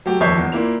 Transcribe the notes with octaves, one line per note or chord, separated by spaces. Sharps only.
F#3 A3 G4
D#1 F2 C#5 E5 G6 C7
E2
A#2 A#3 E4 F7